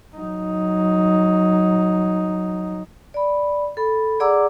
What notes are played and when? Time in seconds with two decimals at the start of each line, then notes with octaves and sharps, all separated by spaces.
0.16 F#3 D#4
3.14 D5 B5
3.77 A4 B5
4.20 G#4 D5 F#5 A#5 D6 E6